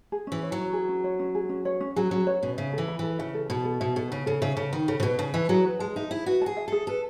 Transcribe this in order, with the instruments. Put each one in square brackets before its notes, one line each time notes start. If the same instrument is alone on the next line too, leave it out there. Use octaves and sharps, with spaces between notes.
[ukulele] G#4
[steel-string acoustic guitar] E3 [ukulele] C#4
[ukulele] C#5
[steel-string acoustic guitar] F#3
[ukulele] C#4
G#4
C#4
C#5
C#4
G#4
C#4
C#5
C#4
[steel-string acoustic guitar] F#3 [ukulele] G#4
[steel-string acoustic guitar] F#3 [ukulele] C#4
[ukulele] C#5
[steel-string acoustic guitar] B2 [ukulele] C#4
[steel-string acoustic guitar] C#3 [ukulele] E5
[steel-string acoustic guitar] E3 [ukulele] A4
[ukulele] B5
[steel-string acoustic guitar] E3 [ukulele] A4
[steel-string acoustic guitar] C#3 [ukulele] E5
[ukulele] A4
[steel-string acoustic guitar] B2 [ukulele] B5
[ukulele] A4
[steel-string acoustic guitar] B2 [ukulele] E5
[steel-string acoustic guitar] B2 [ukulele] A4
[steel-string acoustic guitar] C#3 [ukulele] B5
[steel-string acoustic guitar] C#3 [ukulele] A4
[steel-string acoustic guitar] C#3 [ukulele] E5
[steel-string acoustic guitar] C#3 [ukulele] A4
[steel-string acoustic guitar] D#3 [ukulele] B5
[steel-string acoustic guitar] C#3 [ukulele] A4
[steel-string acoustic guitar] C#3
[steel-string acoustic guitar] B2 [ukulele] B4
[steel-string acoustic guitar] C#3 [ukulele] A5
[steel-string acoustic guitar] E3 [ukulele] E5
[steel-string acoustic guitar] F#3 [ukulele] G#4
[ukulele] B4
[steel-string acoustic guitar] G#3 [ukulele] A5
[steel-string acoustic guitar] D#4 [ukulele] E5
[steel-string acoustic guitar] E4 [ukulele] G#4
[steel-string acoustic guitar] F#4 [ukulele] B4
[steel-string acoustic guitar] G#4 [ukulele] A5
[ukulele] E5
[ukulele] G#4 [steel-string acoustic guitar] A4
[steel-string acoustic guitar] A4 [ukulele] B4